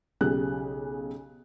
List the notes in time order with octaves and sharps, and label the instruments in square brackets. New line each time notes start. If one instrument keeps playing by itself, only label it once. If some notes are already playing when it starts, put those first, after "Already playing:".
[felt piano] B1 C#3 G4 F#6